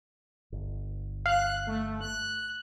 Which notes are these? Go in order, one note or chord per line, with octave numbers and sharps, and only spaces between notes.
G1
F5 F#6
A3
F#6